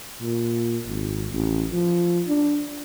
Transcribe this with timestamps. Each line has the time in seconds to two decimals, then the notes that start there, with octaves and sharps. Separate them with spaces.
0.21 A#2
0.87 G#1
1.33 A1
1.72 F3
2.28 D4